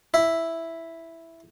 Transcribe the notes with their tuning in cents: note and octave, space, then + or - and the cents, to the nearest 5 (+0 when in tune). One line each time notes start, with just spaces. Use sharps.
E4 +0 E5 +0